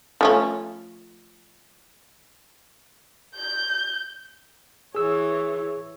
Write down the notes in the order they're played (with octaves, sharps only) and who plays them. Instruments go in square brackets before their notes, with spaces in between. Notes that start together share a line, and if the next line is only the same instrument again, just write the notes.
[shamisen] F3 A3 C#4
[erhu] G6
[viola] E3 C#5 [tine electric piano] G#4 E6